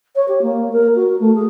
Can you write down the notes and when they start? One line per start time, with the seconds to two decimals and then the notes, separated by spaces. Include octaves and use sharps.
0.15 C#5
0.28 G4
0.42 A#3
0.72 A#4
0.95 F#4
1.20 A3
1.35 G#4